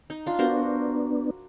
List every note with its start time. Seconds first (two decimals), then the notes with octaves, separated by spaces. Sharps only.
0.10 D#4
0.26 D4 F4
0.39 B3 D4 F#4 A#4 C5